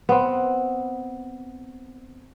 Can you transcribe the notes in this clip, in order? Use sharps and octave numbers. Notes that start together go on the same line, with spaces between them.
B3 C4